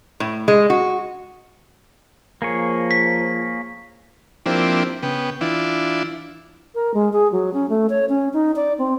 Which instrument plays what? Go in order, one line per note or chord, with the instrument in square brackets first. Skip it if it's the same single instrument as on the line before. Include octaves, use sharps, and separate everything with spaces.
[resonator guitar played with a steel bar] A2
G#3
F#4
[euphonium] F3 [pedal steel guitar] A#3 G#4 C#5
[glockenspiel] B6
[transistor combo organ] F3 A#3 C4 D4 E4 G4
C#3 B3 G5
E3 D4 E4 F4
[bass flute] A#4
G#3
G#4
F#3
C#4
A3
C#5
C#4
D#4
D5
C4